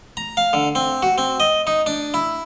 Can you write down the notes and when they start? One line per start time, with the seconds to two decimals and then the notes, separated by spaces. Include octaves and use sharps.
0.17 A#5
0.37 F5
0.53 D3
0.75 C4
1.02 F#4
1.18 C4
1.40 D#5
1.67 D#4
1.86 D4
2.14 E4